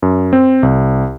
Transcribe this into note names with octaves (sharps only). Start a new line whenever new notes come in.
F#2
C4
C2